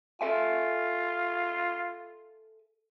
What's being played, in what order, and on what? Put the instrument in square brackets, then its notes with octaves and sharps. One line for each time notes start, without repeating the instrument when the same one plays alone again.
[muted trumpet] F4 [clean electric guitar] A4 E5 G#5